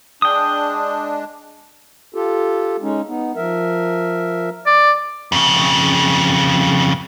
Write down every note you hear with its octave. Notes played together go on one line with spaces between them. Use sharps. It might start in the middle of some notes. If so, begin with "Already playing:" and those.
G#3 D4 G5 D#6
F4 G4 A4
G#3 C#4 D#4
B3 D#4
F3 A#4 E5
D5
F2 C#3